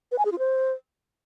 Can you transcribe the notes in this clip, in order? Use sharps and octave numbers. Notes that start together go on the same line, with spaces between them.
B4
G#5
G#4
F4
C5